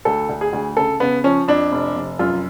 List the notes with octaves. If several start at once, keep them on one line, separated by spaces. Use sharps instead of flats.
D2 A4
D2
G#4
D2
C#3 A4
C#3 B3
F3 C#4
F2 D4
F1
F1
F#2 F4